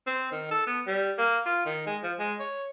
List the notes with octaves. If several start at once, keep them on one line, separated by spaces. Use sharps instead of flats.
C4
D#3
A4
B3
G3
A#3
F4
D#3
G#3
F3
G#3
C#5